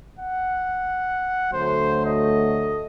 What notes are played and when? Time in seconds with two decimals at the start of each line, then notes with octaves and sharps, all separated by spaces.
0.19 F#5
1.53 D2 F#3 A3 C5
2.05 D#5